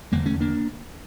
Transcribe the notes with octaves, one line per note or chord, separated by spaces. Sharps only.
F1 E2 D3 G3 A#3
A3 C#4
A#3 D4